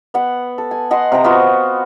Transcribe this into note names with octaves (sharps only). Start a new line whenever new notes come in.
B3 F#5
A4
G#5
D#5 F#5 C6
C3 G5 A#5
B3 F4 F#4 C5